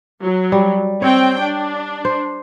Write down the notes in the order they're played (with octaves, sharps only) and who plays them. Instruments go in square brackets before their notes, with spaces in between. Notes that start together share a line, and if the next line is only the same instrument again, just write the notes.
[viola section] F#3
[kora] G3
[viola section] C4 G5 [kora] C#5
[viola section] D4
[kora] C5